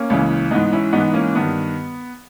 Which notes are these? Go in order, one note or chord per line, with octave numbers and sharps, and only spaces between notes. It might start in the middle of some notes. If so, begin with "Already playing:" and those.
Already playing: A#3 C#4
C#2 C#3 E3
G#2 E3 B3 D#4
C#4 E4
G#2 E3 B3 D#4
A#3 C#4
G2 D#3 B3